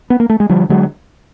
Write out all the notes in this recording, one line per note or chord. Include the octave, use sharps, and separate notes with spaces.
B3
A#3
A3
G#3
D3 F3 G3
D3 F#3 G#3